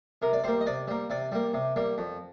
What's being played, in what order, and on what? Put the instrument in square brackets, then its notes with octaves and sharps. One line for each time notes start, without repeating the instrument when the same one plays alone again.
[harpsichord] C3 A#4
D5
G3 A#3 C5
D#5
C3 D5
G3 A#3
C3 D5
G3 A#3
C3
G3 A#3
F2